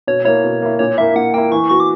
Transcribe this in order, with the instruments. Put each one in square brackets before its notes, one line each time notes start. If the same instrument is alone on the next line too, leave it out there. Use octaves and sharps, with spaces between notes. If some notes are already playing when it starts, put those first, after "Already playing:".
[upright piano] B2 [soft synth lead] C#5
[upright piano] A#3 E4 [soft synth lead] C#5
[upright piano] B2
A#3 E4
[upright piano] A#2 [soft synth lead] C#5
[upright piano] A#3 E4 [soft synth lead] E5
[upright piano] A#2 [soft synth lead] F#5
[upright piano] A#3 E4 [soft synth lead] G5
[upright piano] E3 [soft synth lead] C#6
[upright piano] B3 F#4 [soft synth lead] C#6
[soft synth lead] D6